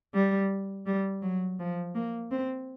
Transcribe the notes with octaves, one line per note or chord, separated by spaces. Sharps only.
G3
G3
F#3
F3
A#3
C4